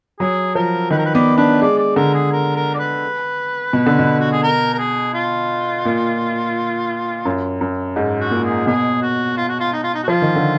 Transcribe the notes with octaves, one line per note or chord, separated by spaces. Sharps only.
F#3 G#4
F3 A#4
D#3 B4
A#4
B4
B3 D5
D4 B4
G#3 D5
D5
D3 A#4
G#4
A#4
A#4
D5
B4
B2
D3
B2
F#4
G#4
A#4
A#4
G#4
F4
A#2
F#2
F#2
G#2
F#4
A#2
G#4
B2 G#4
F#4
F4
F#4
F4
D#4
F4
D#4
F#4
F3 F4
D#3
D3